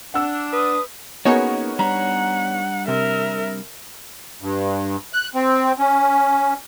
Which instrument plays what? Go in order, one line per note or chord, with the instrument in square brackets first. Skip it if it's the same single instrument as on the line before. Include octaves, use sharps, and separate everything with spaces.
[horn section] D4 [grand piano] F#5 E6
[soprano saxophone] B4 [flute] D#6
[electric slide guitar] A#3 C#4 [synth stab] B3 D#4 C#5 [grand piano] F#4 G#4 A#4
[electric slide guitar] G3 D4 [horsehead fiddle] F#5 [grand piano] A#5
[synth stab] C3 [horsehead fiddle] A#4 E5
[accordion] G2
F#6
C4
C#4